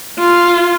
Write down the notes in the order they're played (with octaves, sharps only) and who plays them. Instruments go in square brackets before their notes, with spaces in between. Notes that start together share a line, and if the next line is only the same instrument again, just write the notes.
[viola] F4